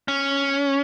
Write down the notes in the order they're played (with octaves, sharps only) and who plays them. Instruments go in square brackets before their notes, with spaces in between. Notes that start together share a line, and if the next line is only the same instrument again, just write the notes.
[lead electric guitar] C#4